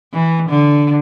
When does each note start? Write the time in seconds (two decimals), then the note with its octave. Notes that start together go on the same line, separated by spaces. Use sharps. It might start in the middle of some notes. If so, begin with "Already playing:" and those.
0.14 E3
0.50 D3